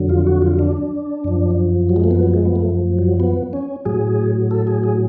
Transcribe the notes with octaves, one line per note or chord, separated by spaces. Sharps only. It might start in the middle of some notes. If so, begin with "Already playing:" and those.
Already playing: F2 D3 F#3
F4
F#4
F4
D4
F#2 F3
F#3
G#3
A3
B3
F#3
G#3
B3
A3
F#3
B3
C#4
A2 F#3 G#4
A4
G#4
G#4